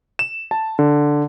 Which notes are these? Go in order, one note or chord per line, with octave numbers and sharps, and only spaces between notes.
E7
A5
D3